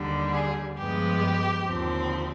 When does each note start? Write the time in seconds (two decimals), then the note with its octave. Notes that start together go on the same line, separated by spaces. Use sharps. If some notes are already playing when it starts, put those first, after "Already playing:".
Already playing: D#2 D3 G3
0.32 G#4
0.77 G2 F3 G#3 B3 G4
1.65 D#2 D3 F3 C4